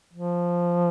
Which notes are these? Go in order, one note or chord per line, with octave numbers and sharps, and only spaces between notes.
F3